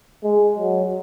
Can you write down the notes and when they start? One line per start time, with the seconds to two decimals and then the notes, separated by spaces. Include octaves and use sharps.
0.23 G#3
0.58 F#3